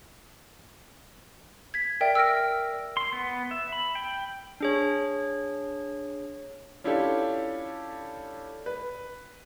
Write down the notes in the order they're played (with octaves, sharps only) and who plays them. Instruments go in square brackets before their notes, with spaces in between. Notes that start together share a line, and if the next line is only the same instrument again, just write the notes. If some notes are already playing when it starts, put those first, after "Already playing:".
[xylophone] G#6 B6
A#4 D5 E5 G5
E6 F6 A#6 D7
[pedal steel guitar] C6
B3
E5
B5
G5
[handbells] D4 G#4 C#5
[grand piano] C#4 D4 E4 F4 G4 A4
B4